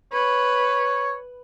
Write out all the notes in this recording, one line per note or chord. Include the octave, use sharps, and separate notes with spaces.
B4 C#5